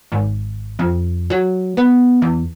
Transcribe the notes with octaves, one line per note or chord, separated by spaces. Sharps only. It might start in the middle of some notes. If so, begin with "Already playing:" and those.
G#1
F2
F#3
B3
E2